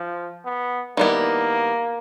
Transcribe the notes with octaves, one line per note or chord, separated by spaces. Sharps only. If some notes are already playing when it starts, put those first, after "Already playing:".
Already playing: F3
B3
D#3 G3 A#3 B3 E4